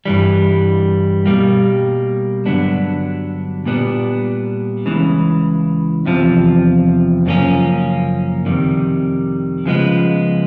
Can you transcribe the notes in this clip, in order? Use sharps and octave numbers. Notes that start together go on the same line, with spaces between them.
G2 E3 G3
B2 G3 A#3
G2 D3 F#3 B3 D4
A#2 G3 B3 D4
C#2 C#3 E3
E2 C3 F3
F#2 C#3 F3 A#3 C#4
F2 C3 D#3 G3
C#3 F3 G#3 B3